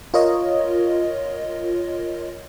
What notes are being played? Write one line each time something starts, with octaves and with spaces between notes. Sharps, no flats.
F4 A#4 C#5 D#5